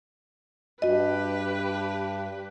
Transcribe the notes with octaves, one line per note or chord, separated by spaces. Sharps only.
G2 F#4 G4 B4 D#5